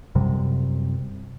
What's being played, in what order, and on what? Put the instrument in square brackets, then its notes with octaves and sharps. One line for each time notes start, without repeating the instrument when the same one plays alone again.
[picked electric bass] F#2 C3 G3